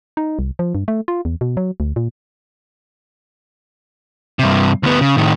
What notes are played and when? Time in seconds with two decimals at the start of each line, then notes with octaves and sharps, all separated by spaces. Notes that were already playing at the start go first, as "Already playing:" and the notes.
0.17 D#4
0.39 C2
0.59 F3
0.75 G2
0.88 A3
1.08 F4
1.25 E2
1.41 B2
1.57 F#3
1.80 D2
1.96 A#2
4.39 G2 C3
4.83 D2 B3
5.01 C#3
5.17 A2 D#3